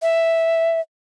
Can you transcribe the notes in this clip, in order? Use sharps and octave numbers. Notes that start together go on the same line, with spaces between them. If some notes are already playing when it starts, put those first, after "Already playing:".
E5